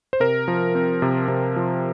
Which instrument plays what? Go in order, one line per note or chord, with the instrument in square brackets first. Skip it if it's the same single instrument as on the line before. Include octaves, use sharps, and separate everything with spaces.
[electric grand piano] C5
C3 A#4
F3
C4
C3
C3
F3